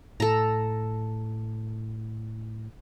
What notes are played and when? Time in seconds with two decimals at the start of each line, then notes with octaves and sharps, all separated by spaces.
0.20 A2 A4 A#5